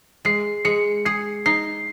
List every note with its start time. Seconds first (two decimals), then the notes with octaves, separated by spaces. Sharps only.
0.25 G#3 C7
0.65 G#3 C#7
1.05 G#4 C7
1.46 D#4 C7